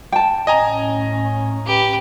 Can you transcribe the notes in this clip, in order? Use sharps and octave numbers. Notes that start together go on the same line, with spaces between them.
G5 A5
A2 C#4 D#5 G#5 A#5
G4 B4